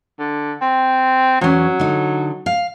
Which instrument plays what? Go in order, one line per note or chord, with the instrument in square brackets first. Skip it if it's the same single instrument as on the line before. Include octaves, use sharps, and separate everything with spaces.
[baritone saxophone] D3
C4
[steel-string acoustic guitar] E2 C#4 [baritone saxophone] F#3
[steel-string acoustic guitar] D3 D#4
F5